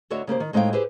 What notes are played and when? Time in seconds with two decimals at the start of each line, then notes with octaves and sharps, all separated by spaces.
0.10 D2 D3 F#4 C#5 D#5 E5
0.27 C#3 A#3 G4 C5
0.40 D#3
0.53 A2 G#3 D#4 C5 F5 G5
0.73 E4 G4 G#4 B4 C5